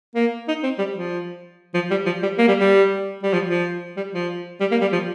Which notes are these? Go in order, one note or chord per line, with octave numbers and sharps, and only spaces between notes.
A#3
D#4
C4
G3
F3
F3
G3
F3
G3
A#3
G3
G3
G3
F3
F3
G3
F3
G3
A#3
G3
F3